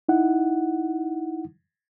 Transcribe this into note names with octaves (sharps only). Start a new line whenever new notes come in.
D#4 E4 F#5